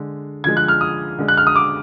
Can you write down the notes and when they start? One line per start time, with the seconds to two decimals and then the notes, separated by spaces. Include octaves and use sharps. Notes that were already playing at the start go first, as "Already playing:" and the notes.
Already playing: D3 G#3
0.44 D3 F3 G#3 G#6
0.57 F#6
0.68 F6
0.81 D#6
1.18 D3 G#3
1.28 F#6
1.37 F6
1.47 D#6
1.56 D6